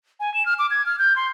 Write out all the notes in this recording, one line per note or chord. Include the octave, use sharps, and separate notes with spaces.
G#5
E7
F6
D6
G#6
F6
G6
C6